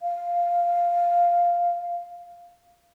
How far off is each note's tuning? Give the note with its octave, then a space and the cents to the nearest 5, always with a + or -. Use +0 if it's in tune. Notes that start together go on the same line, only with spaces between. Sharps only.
F5 -5